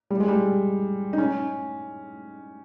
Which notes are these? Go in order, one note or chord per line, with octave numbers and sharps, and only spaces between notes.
G3
G#3
G3
D#4
C#4